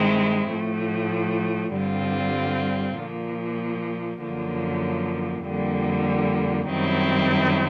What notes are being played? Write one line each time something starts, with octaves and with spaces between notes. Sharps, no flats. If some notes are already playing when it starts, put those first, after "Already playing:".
Already playing: G2 D#3 G#3 C4 E4
A2 F3 A3
G2 D3 G3 C4 F4
A#2 F3 A#3
F#2 D3 F3 A#3
F2 D3 G3 A#3
F#2 D#3 G3 C4 E4